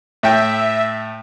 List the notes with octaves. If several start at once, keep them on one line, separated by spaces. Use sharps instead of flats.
A2 E5 G5